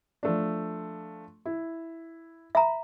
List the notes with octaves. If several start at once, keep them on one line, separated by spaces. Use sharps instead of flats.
F3 A3 D4
E4
E5 A#5 B5